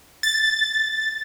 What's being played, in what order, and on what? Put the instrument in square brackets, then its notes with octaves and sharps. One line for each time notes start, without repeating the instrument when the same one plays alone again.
[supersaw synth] A6